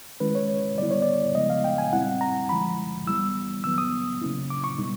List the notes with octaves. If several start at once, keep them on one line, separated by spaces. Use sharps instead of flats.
D#3 G#3 C#4 E4 B4
C#5
D3 G3 B3 E4 D5
C#5
D5
C#3 F3 G#3 B3 D#5
F5
G5
G#5
A#2 G3 C4 E4 F#5
A#5
D3 F3 G#3 B5
E3 G3 B3 E4 E6
D#3 F#3 B3 E6
D#6
C#3 F#3 A#3 C#4 E4
D6
C#6
B2 G3 B3 D#4